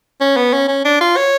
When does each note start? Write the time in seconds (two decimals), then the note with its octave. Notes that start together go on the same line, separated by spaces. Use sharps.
0.21 C#4
0.37 B3
0.53 C#4
0.68 C#4
0.85 D4
1.01 F4
1.17 C#5